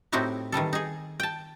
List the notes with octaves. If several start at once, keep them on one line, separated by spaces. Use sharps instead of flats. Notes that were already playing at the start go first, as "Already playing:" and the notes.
A2 C4 D#4 E4 F#4 G4
D#3 E3 G3 A4
D#4 G#4
G5 A5